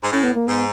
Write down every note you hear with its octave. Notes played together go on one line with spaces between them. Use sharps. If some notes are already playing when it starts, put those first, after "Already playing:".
G#2
A2 C#4
B3
A#3
G#2 B3